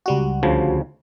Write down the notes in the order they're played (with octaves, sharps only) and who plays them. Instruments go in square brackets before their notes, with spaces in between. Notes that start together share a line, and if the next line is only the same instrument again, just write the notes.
[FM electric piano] C#2 G3 F#4
[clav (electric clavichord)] D2 C#3 F3